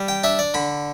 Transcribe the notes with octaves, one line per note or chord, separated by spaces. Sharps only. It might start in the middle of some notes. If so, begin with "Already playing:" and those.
Already playing: G3
G5
D4 E5
D5
D3 B5